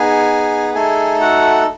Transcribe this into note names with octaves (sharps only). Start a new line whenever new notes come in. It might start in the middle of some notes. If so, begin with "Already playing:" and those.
Already playing: B3 D#4 G#4 G#5
A3 D#4 G#4 A4 G#5
F#4 F#5